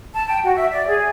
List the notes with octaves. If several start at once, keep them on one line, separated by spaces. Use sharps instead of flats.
A5
G5
F#4
E5
D5
G#4